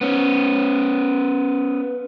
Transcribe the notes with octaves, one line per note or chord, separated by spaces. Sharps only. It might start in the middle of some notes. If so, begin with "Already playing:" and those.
B3 C#4